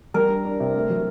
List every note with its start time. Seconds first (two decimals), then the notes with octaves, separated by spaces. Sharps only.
0.14 G3 A#4
0.30 D4
0.45 D4
0.60 C3
0.75 A3
0.90 F#3